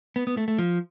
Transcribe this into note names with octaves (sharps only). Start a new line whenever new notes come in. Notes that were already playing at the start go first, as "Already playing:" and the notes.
B3
B3
A3
A3
F3